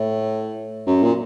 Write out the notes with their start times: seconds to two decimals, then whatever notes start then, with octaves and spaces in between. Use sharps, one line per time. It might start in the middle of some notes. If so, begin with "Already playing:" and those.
Already playing: A2
0.87 F#2
1.03 A#2